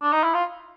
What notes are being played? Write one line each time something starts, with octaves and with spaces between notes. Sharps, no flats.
D4
D#4
E4
F4